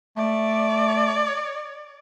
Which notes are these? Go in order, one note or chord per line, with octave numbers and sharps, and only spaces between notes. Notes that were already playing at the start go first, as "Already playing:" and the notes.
A3 D5